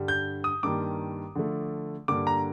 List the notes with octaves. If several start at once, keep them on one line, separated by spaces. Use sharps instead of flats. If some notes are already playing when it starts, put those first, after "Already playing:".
Already playing: G2 D3 G3
G6
D#6
G2 D#3 G3 A#3 D6
D3 F3 A3
G2 D3 G3 A#3 D6
A#5